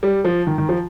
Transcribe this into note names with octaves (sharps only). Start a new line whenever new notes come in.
G3
F3
D#3
D#3
F3